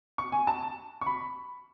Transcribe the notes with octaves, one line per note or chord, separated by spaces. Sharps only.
C#6
G#5
A5
C#6
B5